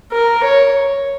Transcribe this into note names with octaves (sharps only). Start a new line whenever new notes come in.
A#4
C#5